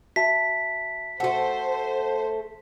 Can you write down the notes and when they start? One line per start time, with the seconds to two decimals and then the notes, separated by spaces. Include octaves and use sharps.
0.16 F#4 E5 A5 B6
1.20 A3 F#4 A4 C5 F#5